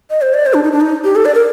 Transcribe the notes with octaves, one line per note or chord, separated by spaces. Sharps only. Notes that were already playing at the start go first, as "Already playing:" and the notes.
D#5
C5
D5
C5
D4
D#4
D4
D#4
G4
A4
D5
A#4